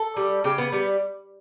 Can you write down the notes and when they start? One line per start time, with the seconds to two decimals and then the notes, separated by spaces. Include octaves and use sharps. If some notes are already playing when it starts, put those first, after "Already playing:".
Already playing: A4
0.17 G3
0.44 C#3 G4
0.58 B3
0.72 G3 B3